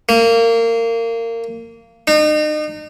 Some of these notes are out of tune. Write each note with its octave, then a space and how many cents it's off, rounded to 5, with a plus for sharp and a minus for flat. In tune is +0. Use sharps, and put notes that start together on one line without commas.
A#3 -25
D#4 -35